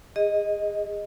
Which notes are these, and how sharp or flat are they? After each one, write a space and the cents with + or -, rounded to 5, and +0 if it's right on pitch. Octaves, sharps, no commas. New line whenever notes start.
G#4 -30 D#5 +0